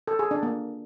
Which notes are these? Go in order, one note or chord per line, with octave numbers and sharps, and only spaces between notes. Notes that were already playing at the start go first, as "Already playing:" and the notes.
A4
G#4
D4
A#3